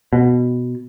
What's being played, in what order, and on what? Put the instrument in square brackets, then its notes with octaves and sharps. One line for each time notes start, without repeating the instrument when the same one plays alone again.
[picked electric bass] B2